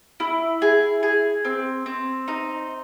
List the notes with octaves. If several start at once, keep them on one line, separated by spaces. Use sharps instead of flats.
E4
G#4
G#4
C4
C4
D#4